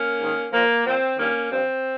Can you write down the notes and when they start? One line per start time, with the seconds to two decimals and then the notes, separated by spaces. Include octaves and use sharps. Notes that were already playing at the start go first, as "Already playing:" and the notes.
Already playing: A#3 C#4
0.19 G#2 D#3
0.52 A#2 F3 A#3
0.85 A#2 F3 C4
1.17 G2 D#3 A#3 C#4
1.50 G2 F3 C4